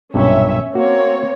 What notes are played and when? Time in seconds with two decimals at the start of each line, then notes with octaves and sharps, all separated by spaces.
0.14 B1 G2 A#2 C#4 E5
0.75 A#3 C4 F#4 C#5